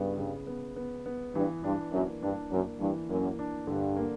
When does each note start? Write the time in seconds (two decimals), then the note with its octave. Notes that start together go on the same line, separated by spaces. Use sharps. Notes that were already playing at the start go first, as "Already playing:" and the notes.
Already playing: G2 C#3 B3 E4
0.18 C#3
0.47 B3
0.76 B3
1.06 B3
1.35 G2 E3
1.64 G2 D4
1.92 F#2 A#3
2.22 G2 D4
2.52 F#2 A#3
2.80 G2 E3
3.09 F#2 A#3
3.39 D4
3.67 G2 D3
3.96 A#3